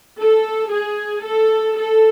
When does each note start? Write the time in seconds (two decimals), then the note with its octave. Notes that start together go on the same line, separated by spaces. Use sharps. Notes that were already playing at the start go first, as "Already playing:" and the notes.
0.20 A4
0.71 G#4
1.24 A4
1.77 A4